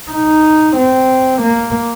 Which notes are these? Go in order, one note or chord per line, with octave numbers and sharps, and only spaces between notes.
D#4
C4
A#3